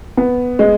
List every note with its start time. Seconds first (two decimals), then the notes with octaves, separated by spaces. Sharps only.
0.17 B3
0.59 G#3